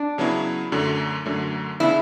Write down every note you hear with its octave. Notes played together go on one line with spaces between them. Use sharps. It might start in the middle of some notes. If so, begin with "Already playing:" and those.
Already playing: D4
C#3 F#3 B3 E4
F#2 D3 F#3 A3
F#2 D3 F#3 A3
C#3 E3 B3 D4 E4